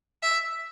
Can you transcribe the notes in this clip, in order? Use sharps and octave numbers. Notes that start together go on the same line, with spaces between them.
E5